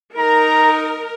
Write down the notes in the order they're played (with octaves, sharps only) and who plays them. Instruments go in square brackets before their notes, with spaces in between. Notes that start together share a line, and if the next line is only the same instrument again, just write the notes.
[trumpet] D#4 [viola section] A#4 [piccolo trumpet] A#5